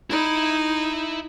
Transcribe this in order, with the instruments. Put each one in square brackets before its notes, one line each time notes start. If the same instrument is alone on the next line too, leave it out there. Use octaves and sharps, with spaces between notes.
[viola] D#4 [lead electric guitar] E4 B5